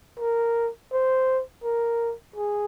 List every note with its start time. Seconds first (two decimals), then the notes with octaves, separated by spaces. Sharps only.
0.20 A#4
0.92 C5
1.64 A#4
2.36 G#4